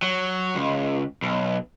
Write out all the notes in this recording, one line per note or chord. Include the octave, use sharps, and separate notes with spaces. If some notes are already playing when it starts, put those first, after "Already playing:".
F#3
C#2
B1